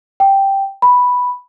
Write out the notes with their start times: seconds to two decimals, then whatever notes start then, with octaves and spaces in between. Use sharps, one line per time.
0.20 G5
0.82 B5